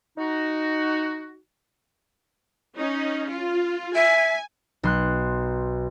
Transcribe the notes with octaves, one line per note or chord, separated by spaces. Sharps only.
D#4 F#4
C#4 D#4
F4
E5 G#5
B1 C6 F#6